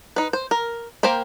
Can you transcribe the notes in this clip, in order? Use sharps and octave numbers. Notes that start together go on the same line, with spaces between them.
D#4 B4
C5
A#4
A#3 A#4 C5 G5 B5